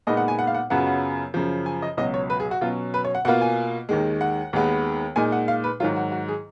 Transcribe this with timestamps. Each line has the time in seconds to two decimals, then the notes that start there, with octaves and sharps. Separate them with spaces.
0.07 A#2 G#3 B3 D#4 D#5
0.17 F#5
0.28 G#5
0.39 F#5
0.47 F5
0.54 F#5
0.70 F#2 C#3 F#3 B3 F4 F#5
0.87 F#5
1.34 F#2 C#3 F3
1.66 G#5
1.82 D#5
1.97 C#2 B2 F#3 D#5
2.14 C#5
2.30 B4
2.40 G#4
2.51 F#4
2.61 B2 F#3 C#4 F4
2.94 B4
3.05 C#5
3.15 F#5
3.25 B2 F#5
3.28 A#3 F4
3.41 G#5
3.89 D#2 D#3 G#3
4.21 F#5
4.53 D#2 D#3 G#3 B3
5.16 A#2 G#3 D#4 G#5
5.32 F#5
5.48 F5
5.64 B4
5.80 G#2 D#3 F#3 F4
5.96 F#4
6.12 F#4
6.28 G#4